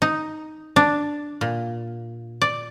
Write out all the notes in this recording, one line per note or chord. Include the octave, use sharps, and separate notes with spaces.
D#4
D4
A#2
D5